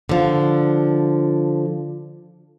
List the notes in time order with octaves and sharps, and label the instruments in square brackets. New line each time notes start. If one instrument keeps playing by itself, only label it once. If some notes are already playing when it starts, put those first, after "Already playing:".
[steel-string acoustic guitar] D3 F3